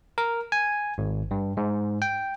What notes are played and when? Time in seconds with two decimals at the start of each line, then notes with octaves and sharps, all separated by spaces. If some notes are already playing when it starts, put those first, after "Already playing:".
0.18 A#4
0.52 G#5
0.98 G#1
1.31 G2
1.57 G#2
2.02 G5